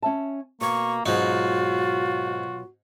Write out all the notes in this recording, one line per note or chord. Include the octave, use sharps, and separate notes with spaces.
C#4 E5 A5
B2 A#3 C#6
G#2 B2 F#3 D#4 F4 F#4